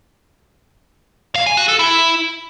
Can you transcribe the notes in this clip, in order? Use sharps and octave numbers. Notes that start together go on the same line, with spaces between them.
F5
G#5
F#4
A4
E4